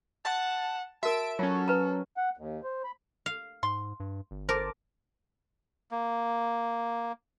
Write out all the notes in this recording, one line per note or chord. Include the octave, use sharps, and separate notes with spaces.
F#5 A5
F#4 A#4 E5 A5 D7
F#3 C#4 F4 A4
B4 A#5
F#5
D#2
C5
B5
F5
G#2 C6
G2
G1
A#4 C5 A5 D6
A#3